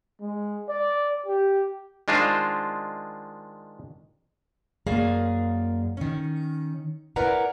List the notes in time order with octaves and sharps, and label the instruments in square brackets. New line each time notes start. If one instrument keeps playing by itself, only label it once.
[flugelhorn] G#3
D5
G4
[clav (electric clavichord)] D#3 G#3 D4 F4 C5
[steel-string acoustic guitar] F#2 A#3 G#4 D5 F5
D#3 C#4
E4 A#4 B4 D5 F#5 A#5